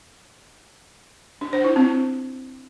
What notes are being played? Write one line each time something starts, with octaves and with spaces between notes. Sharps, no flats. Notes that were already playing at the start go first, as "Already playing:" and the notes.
D4
C5
E4
C4